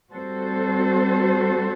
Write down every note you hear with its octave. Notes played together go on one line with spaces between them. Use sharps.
G3 C4 F#4 A4 C5